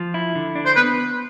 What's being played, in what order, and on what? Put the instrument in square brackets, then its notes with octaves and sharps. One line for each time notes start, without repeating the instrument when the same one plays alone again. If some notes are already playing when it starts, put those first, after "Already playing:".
Already playing: [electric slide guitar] F3
E4
D3
D4
[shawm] C5
[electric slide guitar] B3 [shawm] B4